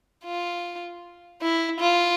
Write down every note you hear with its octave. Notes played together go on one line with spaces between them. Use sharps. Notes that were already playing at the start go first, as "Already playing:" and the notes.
F4
E4
F4